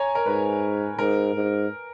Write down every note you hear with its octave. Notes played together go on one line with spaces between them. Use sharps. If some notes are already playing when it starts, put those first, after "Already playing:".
Already playing: C#5 G#5 A#5
A#4
G#2 B4
G#2 A#4
G#2